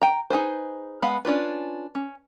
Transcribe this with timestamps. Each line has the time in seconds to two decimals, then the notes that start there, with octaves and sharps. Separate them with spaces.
0.02 G5 A#5
0.30 D#4 G#4 B4 C5
1.02 G#3 B3 F5 F#5 B5
1.25 C#4 D4 F4 B4
1.95 C#4